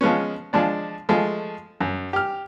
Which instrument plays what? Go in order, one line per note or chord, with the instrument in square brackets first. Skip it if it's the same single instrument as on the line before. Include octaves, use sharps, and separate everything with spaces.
[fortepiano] F3 G#3 B3 C#4
F3 G#3 D4 D5
F3 G#3 A3
F#2
G4 F6